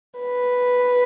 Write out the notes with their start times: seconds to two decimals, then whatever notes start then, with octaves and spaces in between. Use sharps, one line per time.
0.19 B4